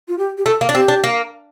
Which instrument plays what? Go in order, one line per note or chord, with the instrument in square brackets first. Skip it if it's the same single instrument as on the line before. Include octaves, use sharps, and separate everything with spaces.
[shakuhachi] F4
G4
G4
[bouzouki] A3 [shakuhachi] A4
[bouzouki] A#3
D4
[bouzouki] C4 [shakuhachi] G4
[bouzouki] D4
A#3